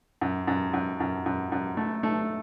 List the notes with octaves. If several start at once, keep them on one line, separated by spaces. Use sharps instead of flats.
F#2
F#2
F#2
F#2
F#2
F#2
A3
A3